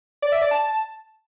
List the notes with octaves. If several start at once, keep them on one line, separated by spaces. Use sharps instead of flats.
D5
E5
D5
A5